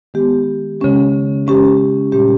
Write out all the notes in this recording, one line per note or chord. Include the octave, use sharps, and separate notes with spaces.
D#3 G#3 B3 G4
C#3 G#3 C#4 G4
C#3 G#3 C#4 G4
A#2 G3 C#4 G4